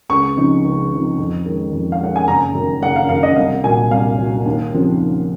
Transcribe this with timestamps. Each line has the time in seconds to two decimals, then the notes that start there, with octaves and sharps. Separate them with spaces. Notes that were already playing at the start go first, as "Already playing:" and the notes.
0.09 C#2 C#6
0.37 C#3 F3 C4 D#4
0.65 C#2
0.91 C#3 F3 C4 D#4
1.18 F2
1.46 D#3 G#3 C#4
1.72 F2
1.92 F5
2.01 D#3 G#3 C#4 F#5
2.16 G#5
2.27 F#1 A#5
2.55 F#2 D#3
2.82 F#1 F#5
2.96 F5
3.09 F#2 D#3 F5
3.23 D#5
3.36 C2 F5
3.63 A#2 F#3 G#5
3.91 C2 F5
4.19 A#2 F#3
4.46 D#2
4.73 C#3 F3 C4
5.00 D#2